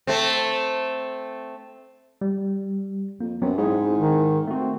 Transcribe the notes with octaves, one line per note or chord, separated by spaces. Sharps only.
A3 C4
G3
F2 A#3
F#2 F#3 B3 C4
G#2 C4 E4 G#4
D#3
A3 C4 F#4